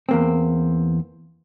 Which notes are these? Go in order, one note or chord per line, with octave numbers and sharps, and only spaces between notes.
E2 A#3 C4